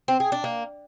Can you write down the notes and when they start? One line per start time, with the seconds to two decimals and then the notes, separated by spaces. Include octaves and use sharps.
0.08 C4
0.20 G#4
0.32 D4
0.44 A#3